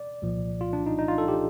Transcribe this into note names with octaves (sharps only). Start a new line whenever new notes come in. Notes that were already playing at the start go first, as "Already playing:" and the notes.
Already playing: D5
C2 A#2 F3
F4
D4
D#4
D#4
F4
A4
G4